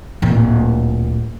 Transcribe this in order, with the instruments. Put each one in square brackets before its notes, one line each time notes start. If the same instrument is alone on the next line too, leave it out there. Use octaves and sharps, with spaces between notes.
[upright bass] D1 A#2